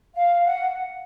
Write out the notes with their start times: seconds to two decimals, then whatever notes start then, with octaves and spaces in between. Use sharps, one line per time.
0.14 F5
0.45 F#5